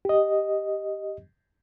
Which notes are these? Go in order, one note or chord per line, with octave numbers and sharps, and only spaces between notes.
G4 D#5